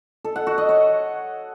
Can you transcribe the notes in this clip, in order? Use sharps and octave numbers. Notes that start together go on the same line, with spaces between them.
A4
F#5
F#4
D#5
C#5